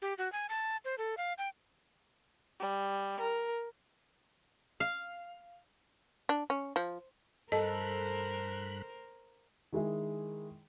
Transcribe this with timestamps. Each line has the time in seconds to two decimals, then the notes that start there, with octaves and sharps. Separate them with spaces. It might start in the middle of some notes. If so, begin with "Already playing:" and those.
0.02 G4
0.18 F#4
0.33 G#5
0.49 A5
0.85 C5
0.98 A4
1.17 F5
1.38 G5
2.59 G3
3.19 A#4
4.80 F5
6.29 D4
6.50 C#4
6.76 F3
7.52 G2 A4 A#4 C5 D#5 B5 F#6
9.73 D#3 G#3 E4 G#4